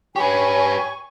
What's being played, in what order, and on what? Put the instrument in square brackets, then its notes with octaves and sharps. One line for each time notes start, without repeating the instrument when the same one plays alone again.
[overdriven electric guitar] G4 B4 [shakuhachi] C#5 [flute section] G#5 [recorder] C#6